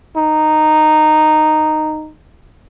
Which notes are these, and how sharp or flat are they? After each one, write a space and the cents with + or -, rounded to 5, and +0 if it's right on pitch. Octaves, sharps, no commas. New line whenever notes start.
D#4 -10